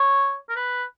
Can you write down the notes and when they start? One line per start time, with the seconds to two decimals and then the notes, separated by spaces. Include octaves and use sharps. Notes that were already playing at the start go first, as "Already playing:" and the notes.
Already playing: C#5
0.49 A#4
0.56 B4